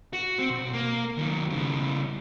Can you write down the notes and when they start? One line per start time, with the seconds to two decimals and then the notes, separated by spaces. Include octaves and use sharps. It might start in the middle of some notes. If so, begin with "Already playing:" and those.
0.13 F#4
0.39 C4
0.50 B1
0.73 A#3
1.18 D#3 F#3
1.50 C#3 G3